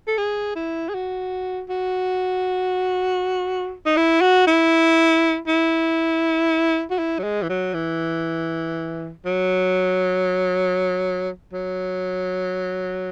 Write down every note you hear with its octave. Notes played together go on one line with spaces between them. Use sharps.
A4
G#4
E4
G#4
F#4
F#4
D#4
E4
F#4
E4
E4
F#4
E4
F#3
G#3
E3
F#3
E3
F#3
F#3